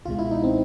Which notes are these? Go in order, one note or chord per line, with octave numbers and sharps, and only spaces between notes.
C#2 B2 G#3 F4
E4
D#4
C4